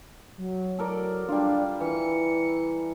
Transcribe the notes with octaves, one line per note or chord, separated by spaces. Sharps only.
F#3
A4 A#4 D5
G3 D4 F4
E3 C#7